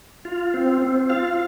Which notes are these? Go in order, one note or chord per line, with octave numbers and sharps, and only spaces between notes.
F4
C4
C4
F4 F5